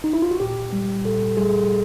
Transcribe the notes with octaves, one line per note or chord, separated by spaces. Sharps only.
D#4
E4
F4
F#4
A#2 G4
G3
A#2 A4
G3 G#4